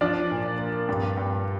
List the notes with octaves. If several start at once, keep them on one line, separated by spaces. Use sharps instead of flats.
F3 D4 D5
A#2
A#3
G2
G2